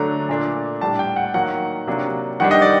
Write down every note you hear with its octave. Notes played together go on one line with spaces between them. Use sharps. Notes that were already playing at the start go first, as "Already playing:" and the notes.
Already playing: D3 F#3 A3 D4 A#5
A#2 A3 D4
A2 G3 D4 A5
G5
F#5
D#3 F#3 A#3 F#5
C3 F#3 A#3 D4
D#3 G3 D4 F#5
D#5
D5